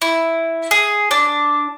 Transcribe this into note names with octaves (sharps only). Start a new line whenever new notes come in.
E4
G#4
D4